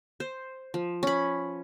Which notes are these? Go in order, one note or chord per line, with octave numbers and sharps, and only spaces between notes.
C5
F3
C#4 B5